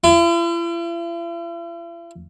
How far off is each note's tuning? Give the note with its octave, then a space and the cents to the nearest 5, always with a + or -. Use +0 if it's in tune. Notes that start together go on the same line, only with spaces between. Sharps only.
E4 +45